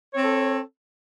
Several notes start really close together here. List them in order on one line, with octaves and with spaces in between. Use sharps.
C#5 C4 A4